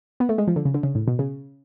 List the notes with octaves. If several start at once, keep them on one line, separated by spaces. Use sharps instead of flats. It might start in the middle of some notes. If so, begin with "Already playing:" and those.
B3
A3
G#3
F3
D3
C#3
D3
C#3
A2
B2
C#3